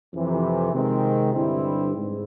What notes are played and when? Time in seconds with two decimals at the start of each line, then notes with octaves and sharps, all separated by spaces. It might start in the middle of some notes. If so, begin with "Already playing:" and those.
0.12 F2 C3 E3
0.74 C3 D#3 G#3 C4
1.34 G2 D3 G3 C4 E4
1.96 G#2